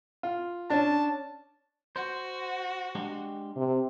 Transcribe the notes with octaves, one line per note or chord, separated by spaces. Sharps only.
F4
C#4 D4 A5
F#4 C5
G#3 D4 G4
C3